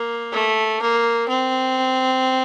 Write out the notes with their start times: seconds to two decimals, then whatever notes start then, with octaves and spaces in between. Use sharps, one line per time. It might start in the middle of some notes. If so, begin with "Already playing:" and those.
Already playing: A#3
0.32 A3
0.81 A#3
1.28 C4